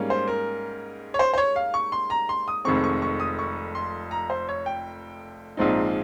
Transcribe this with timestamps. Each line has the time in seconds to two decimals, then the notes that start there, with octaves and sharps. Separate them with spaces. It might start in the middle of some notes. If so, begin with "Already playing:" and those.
Already playing: G#2 G3 A#3 C#4
0.10 C5
0.28 A#4
1.14 C#5
1.19 C5
1.34 C5
1.38 C#5
1.56 F5
1.74 C#6
1.92 C6
2.10 A#5
2.29 C6
2.48 D#6
2.65 F1 F2 D#3 G#3 C4 C#6
2.84 C#6
3.02 C#6
3.20 D#6
3.39 C#6
3.75 C6
4.11 A#5
4.30 C5
4.49 C#5
4.66 G5
5.57 A#1 G#2 F3 C4 D#4